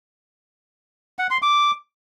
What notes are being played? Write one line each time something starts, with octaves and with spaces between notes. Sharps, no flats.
F#5
C6
D6